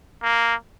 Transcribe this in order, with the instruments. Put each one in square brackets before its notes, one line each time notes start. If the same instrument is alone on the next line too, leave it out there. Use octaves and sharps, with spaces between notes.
[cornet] A#3